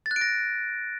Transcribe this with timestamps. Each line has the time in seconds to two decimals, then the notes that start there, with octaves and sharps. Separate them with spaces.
0.06 A6
0.11 F#6
0.16 D7
0.21 A#6